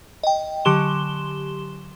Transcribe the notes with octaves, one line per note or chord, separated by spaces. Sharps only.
D#5 G5
D3 F#3 G4 C6 E7 G7